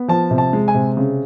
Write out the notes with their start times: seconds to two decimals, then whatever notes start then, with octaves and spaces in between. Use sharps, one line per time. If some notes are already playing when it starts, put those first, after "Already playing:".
Already playing: B3
0.08 F3 A5
0.31 C3
0.38 A5
0.53 G#3
0.68 G#5
0.75 C3
0.97 C#3